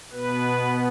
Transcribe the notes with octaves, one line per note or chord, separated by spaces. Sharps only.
B2 B3 B4